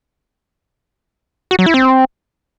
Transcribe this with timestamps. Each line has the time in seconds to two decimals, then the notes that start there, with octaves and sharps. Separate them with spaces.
1.51 F#4
1.59 F#3
1.66 E4
1.74 C4